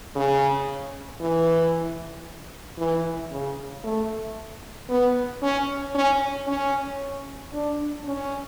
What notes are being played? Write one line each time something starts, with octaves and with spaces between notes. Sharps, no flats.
C#3
E3
E3
C#3
A3
B3
C#4
C#4
C#4
D4
C#4